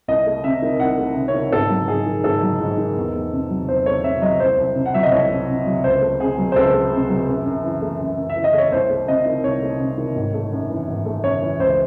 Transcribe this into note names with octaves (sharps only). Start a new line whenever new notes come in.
C2 D#5
A3
C3 E5
D#3
C2 F#5
A3
C3
C#5
D#3
G#1 A4
F#3
G#2 G#4
D#3
G#1 A4
F#3
G#2
D#3
E2
A3
C3
F#3
E2 C5
A3 C#5
C3 E5
F#3 D#5
C2 C5
C2
C3
F#5
F#3 E5
D#5
C2 C#5
C2
C3
F#3
C#2 C5
A3
C3 G#4
F#3
C5
C#2 A4
A3
C3
F#3
F#2
F#2
E3
A3
F#2
F#2
E5
E3
D#5
A3 C#5
C2 C5
A3
C3 D#5
D#3
C2 C#5
A3
C3
D#3
G#1
A3
F#2
E3
G#1
A3
F#2 C#5
E3
C#2 C5